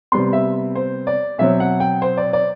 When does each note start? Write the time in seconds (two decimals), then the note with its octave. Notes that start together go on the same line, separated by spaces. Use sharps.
0.12 C3 G3 B3 C6
0.33 E5
0.75 C5
1.07 D5
1.38 B2 F#3 C4 E5
1.60 F#5
1.80 G5
2.02 C5
2.17 D5
2.33 D5